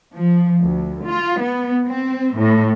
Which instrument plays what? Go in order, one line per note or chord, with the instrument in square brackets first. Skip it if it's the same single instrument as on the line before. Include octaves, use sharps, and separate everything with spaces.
[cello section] F3
D2
F4
B3
C4
A2